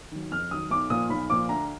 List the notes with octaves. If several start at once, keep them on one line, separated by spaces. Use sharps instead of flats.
D#3 F#3
F2 F6
D#3 F#3 D#6
B1 D6
A#2 F3 D#6
B1 B5
A#2 F3 D6
D2 A#5